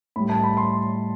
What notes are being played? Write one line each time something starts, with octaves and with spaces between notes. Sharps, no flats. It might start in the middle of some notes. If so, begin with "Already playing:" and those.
A2 G3 B5
A5
B5
C6